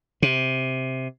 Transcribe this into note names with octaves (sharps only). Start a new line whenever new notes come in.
C3